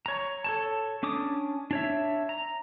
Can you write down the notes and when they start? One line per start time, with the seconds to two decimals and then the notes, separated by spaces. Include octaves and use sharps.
0.06 C#5 A#5
0.44 A4 C#5 A5
1.03 C#4 D4 D6 D#6
1.71 D4 C#5 E5
2.29 A#5